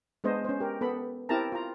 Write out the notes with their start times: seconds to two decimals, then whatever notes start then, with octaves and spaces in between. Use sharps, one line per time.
0.24 G#3 B3 D4 C5 D#5
0.45 C#4 C5
0.60 G4 A#4
0.81 B3 A4 B5
1.29 C4 E4 G4 A#4 A5 A#5
1.52 F4 A#5